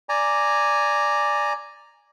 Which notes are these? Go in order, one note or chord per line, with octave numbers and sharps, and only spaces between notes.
D5 G#5 A#5